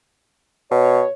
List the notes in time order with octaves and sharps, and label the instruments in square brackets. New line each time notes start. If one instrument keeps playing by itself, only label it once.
[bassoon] B2 [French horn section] C#5